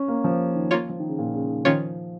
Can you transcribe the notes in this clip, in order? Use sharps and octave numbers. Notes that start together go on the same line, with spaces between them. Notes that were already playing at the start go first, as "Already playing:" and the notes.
Already playing: C#4
A#3
F3
D#3
A#3 F4 C#5
F3
D#3
C#3
A#2
C#3
D#3
D#3 F3 C#4 F4 C#5